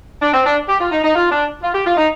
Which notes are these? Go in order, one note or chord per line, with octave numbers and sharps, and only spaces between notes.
D4
C4
D4
G4
F4
D#4
D#4
F4
D4
F4
G4
F4
D#4